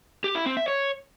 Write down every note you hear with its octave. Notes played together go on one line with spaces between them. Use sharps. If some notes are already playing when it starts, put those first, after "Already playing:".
G4
E4
C4
E5
C#5